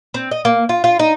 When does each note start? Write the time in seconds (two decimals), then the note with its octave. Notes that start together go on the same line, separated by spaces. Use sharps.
0.14 C4
0.31 D#5
0.45 A#3
0.69 F4
0.84 F4
0.99 D#4